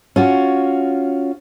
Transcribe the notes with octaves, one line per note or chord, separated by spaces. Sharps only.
C#4 F4 F#4